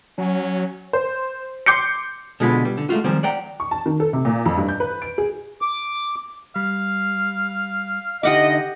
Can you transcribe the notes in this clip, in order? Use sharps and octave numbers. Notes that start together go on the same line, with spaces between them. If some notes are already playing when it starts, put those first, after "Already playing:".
F#3 C#4
C5
C6 D6 G6 C7 C#7
B2 D3 G#3 F4 B4
G3
D3
G#3 A3 F4 F#4
D#3 F3 G3 G#3 C4
D5 F#5 G5 A#5
C#6
A5
D#3
A4
C3
A#2
F2
G2
G6
B4
D7
G#4
D6
G3 F5
D3 D#4 G4 D#5 E5 F#5 D6